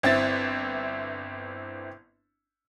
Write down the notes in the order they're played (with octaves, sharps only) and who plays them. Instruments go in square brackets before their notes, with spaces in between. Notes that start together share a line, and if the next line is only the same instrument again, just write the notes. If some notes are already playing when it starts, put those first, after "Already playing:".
[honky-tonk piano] G1 C4 E4 A6